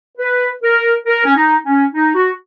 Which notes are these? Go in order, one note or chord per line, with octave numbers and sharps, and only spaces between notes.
B4
A#4
A#4
C#4
D#4
C#4
D#4
F#4